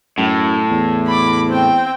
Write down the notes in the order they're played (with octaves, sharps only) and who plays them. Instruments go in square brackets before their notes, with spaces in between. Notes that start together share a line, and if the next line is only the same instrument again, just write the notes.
[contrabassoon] F#2 [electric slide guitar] A2
[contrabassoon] E2
[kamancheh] B5 D6
C4 G5